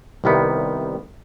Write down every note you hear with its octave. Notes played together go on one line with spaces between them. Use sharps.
C2 C3 D#3 G3 B3